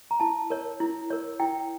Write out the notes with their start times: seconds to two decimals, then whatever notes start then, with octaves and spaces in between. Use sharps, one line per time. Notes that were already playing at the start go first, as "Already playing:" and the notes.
0.11 A#5
0.20 E4 A5
0.50 A#4 C#5
0.80 E4
1.10 A#4 C#5
1.40 E4 G5